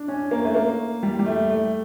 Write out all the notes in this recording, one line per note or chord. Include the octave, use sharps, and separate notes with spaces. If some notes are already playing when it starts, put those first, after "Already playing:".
Already playing: D4
C#4
A#3
A3
A#3
G3
G3
A3
A3